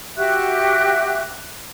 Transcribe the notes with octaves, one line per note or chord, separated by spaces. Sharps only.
F#4 G4 E5 F#6